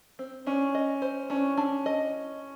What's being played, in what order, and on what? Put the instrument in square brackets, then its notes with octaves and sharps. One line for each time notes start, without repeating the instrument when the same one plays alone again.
[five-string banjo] C4
[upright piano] C#4 [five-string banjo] D4
[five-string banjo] D#5
C5
[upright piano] C#4 [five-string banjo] D4
[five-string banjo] D4
D#5